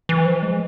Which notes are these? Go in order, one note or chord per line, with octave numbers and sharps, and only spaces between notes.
E3
F3
G#3